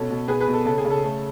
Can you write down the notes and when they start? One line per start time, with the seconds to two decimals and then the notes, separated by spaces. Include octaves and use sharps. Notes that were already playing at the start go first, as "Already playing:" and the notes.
Already playing: B2 C#4 A4
0.10 B2
0.28 B2 G#4 B4
0.40 G#4 B4
0.48 B2
0.53 A4
0.65 C#3 A4
0.78 G#4
0.85 C#3
0.90 A4
1.03 A3